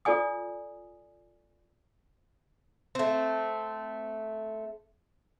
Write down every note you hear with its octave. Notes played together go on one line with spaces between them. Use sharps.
F4 A4 D5 G#5 D#6
A3 C4